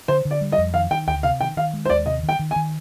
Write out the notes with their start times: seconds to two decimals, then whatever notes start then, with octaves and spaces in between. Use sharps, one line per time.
0.08 D3 C5
0.25 D3
0.31 D5
0.41 G3
0.52 D#5
0.58 F2
0.74 D#3 F5
0.91 D#3 G5
1.07 D2 G5
1.23 C3 F5
1.40 D#3 G5
1.57 D#3 F5
1.73 G#3
1.85 C5
1.90 D#2 D5
2.06 C3 D#5
2.23 D#3
2.29 G5
2.39 D#3
2.51 G#5
2.56 D#3